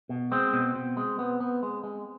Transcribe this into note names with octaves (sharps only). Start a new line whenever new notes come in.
B2
G#3 C4
B2
B2
G#3
B3
B3
G#3
G#3